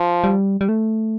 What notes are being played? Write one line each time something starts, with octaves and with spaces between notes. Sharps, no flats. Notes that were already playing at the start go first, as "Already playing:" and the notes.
Already playing: F3
G3
G3
A3